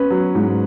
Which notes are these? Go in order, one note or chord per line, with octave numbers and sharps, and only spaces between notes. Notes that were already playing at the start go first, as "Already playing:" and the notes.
Already playing: C#4 B4
F#3
G#2